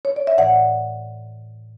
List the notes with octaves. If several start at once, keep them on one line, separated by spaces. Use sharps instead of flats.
C#5
D5
E5
A2 E3 D5 F#5